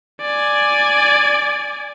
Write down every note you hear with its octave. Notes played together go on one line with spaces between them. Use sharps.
D5 G#5